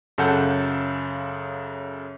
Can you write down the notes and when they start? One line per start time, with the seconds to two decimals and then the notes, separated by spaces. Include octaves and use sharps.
0.18 F#2 C#3 A4 F#5 A5 G6